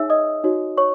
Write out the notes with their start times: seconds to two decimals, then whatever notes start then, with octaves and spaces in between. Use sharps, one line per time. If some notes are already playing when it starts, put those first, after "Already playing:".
Already playing: D#4 G#4 C#5 E5 G#5 E6
0.10 D#5 D#6
0.44 D#4 F#4 C#5
0.77 C#5 C#6